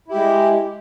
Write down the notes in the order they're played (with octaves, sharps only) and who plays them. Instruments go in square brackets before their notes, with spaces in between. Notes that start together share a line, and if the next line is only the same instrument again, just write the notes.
[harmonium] E4
G4
G#3